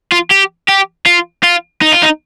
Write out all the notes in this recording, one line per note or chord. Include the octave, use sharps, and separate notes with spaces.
F4
G4
G4
F4
F4
D#4
F4
D#4